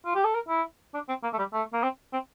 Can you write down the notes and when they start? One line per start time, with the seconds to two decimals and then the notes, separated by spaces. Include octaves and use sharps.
0.05 F4
0.15 G4
0.24 A4
0.35 A#4
0.49 E4
0.94 D4
1.09 C4
1.23 A#3
1.33 A3
1.38 G3
1.53 A3
1.73 A#3
1.83 C4
2.13 C4